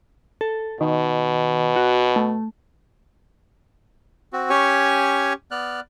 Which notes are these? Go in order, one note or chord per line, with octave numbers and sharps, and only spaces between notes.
A4
B2 D#3
F#4
A3
C4 F#4
C#4 G4 C#5 G#5 C#6
B3 D5 F6 F#6